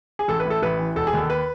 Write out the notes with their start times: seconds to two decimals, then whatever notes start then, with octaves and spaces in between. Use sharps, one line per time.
0.19 G#4
0.28 A1 A4
0.40 B4
0.45 A2 A4
0.62 A1 B4
0.79 E3
0.96 E1 A4
1.07 G#4
1.13 D#2 A4
1.30 B4